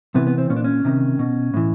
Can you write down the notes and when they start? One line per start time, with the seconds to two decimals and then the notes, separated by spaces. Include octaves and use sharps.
0.15 C3 E3 B3
0.27 B3
0.38 C4
0.50 A#2 C#4
0.57 D4
0.64 C#4
0.85 C3 D#3
1.19 B2
1.54 A2 E3